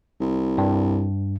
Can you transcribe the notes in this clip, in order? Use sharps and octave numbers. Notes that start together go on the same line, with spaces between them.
C2
G2